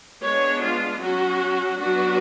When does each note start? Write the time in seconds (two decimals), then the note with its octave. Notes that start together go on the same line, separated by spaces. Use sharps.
0.23 G#3 B3 D4 C#5
0.63 F4
1.01 F#3 C#4 F#4
1.79 F#3 B3 D4 F#4